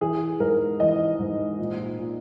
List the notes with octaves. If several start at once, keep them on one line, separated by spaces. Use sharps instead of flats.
E3 G#4
G#2 A#4
E3 D#5
G#2
A#2
A#2